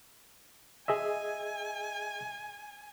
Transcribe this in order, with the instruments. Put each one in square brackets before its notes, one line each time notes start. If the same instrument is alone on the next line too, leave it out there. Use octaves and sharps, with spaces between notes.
[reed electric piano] G#4 D#5 E5 [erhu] G#5